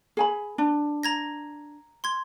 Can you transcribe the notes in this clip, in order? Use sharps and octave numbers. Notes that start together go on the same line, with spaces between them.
G#4 G#5 B5
D4
A#5 G#6 A#6
C6 G#6